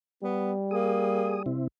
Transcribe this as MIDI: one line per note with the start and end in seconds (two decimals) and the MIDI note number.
0.23 1.57 55
0.23 0.53 59
0.71 1.41 58
0.71 1.43 68
0.71 1.43 87
1.46 1.68 48
1.46 1.68 60
1.46 1.68 64